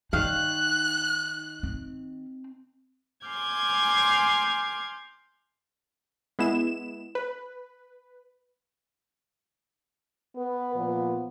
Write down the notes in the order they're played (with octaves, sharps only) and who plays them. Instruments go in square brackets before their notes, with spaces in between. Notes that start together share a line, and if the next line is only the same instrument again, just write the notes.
[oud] D#3 F5 [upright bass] D#4 [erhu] F#6
[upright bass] C4
[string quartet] G#5 C6 D6 F6 G6 G#6
[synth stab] G#3 B3 E4 E7
B4
[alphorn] B3 [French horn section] B4
[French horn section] A#2 F3